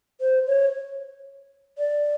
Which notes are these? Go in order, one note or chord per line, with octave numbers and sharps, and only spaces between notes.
C5
C#5
D5